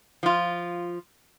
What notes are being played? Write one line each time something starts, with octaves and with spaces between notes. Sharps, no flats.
F3 F4